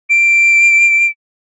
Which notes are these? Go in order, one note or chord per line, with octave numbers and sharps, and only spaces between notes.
D7